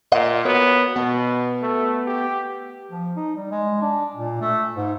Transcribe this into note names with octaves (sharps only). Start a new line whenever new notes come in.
A#2 D#5 F5 F#5
B3 F#4 A#4 C#5
B2 B3
A3
G4
F3
D#4
G3
G#3
D4
A#2
A3
G#2